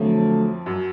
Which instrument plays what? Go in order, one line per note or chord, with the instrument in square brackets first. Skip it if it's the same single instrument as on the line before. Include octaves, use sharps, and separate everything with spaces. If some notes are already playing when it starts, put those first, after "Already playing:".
Already playing: [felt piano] F2 F3 [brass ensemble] D3 F#3 A3
[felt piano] F#2 F#3